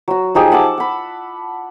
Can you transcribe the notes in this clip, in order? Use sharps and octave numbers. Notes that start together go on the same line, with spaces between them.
F#3 F#4
F3 D#4 G4 G#4
F#5 A5 D6 E6
F#5 B5